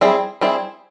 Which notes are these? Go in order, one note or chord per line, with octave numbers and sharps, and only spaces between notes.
G3 C4 E4 G#4
G3 C4 E4 G#4